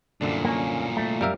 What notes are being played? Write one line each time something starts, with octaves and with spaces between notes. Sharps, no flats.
C2 F#2 A#2 D3 D4
A#3 C#4
A3
F#2 G3 A#4 E5 F5